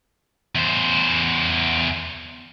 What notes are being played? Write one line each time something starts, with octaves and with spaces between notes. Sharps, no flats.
E2 C5